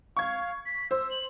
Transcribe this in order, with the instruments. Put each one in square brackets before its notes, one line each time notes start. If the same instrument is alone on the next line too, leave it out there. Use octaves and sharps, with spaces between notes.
[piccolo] F5 [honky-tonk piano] C#6 G#6
[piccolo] B6
[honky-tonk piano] C5 [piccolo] E6
[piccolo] F#7